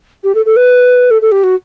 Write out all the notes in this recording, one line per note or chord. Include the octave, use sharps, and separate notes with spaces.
G4
A4
A4
B4
A4
A4
G4
F#4